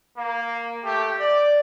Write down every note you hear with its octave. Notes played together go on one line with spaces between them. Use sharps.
A#3
A3 G4
D5